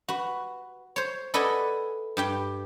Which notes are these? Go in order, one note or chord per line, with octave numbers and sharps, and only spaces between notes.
F#4 B4
C5 C#5
A4 B4 D5 D#5 F#5 G#5
G2 G4 G5